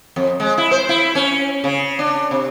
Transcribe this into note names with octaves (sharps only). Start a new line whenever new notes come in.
F2
G#3
E4
C5
E4
C#4
C#3
D4
C3